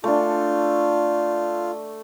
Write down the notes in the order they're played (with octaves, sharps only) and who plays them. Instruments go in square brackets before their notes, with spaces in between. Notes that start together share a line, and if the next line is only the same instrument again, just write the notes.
[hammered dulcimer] A3 D4 [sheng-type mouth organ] F4